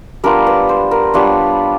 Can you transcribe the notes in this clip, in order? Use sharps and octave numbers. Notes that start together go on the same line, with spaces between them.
G3 B3 D4 F4 A#4
B4
C5
A#4
G3 B3 D4 F4 C#5